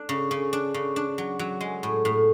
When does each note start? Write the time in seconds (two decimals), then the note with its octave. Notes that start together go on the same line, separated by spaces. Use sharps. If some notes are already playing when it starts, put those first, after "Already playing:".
Already playing: D4
0.09 C#3
0.31 C#3
0.53 D4
0.74 C#3
0.96 D4
1.18 F#3
1.39 F#3
1.61 G#3
1.83 A2
2.05 A2